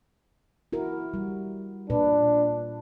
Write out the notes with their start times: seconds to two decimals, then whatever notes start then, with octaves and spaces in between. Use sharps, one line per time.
0.73 E4 F#4 A#4
1.14 G3
1.90 A#2 D4 B4